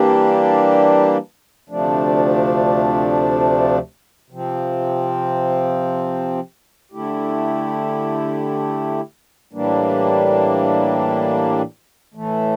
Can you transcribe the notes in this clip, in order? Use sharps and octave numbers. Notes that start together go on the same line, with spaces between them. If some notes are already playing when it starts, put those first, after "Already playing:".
Already playing: E3 G3 A#3 D4 G4
D2 C3 F3 A3 D4
C3 F3 C4
D3 A3 E4 G4
A2 E3 G3 A#3 D4
A2 E3 A3